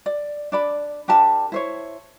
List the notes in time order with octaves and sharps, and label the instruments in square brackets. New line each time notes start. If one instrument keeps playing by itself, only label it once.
[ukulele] D5
D4 D5 B5
D4 G4 A#4 A5
E4 C5 C#5